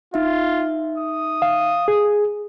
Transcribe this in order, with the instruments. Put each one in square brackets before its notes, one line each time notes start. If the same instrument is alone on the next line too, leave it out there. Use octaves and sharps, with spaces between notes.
[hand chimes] D#4 E5 [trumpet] F4
[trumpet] D#6
[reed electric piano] F5
G#4